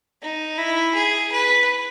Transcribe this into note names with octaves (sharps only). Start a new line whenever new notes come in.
D#4
E4
G#4
B4